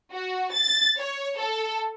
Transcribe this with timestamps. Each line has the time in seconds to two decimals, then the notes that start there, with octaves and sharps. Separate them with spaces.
0.12 F#4
0.52 A6
0.98 C#5
1.39 A4